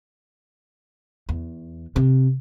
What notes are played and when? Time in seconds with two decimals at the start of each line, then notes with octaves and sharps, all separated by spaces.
1.29 E2
1.96 C3